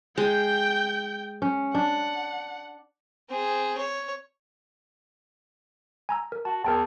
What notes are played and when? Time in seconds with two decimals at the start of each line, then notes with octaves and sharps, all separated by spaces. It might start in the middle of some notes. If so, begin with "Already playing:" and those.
0.17 G#3 G5 G6
1.42 C#4
1.75 D4 F#5
3.29 C4 G#4
3.77 C#5
6.09 G#5 A#5 E6
6.32 A#4
6.45 F#4 A5
6.64 E2 A#4 G5 A5 C6